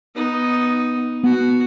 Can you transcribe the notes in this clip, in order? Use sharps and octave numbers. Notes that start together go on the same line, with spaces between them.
B3 D#4
B3 F#4